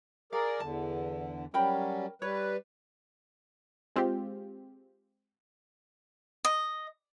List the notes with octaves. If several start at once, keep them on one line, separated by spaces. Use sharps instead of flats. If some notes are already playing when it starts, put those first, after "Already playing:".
G#4 A#4 D5 F5
E2 D3 A5
F#3 G3 C#4 A#4 G5 B5
G3 B4 C#5
G#3 C4 F4 G4
D#5